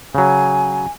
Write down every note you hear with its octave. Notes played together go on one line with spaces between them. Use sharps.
C#3 F#3 G#5